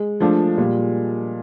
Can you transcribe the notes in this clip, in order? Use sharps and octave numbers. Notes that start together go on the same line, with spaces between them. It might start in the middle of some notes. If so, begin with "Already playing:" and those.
Already playing: G#3
F3 A3 D4 F4
A#2 G3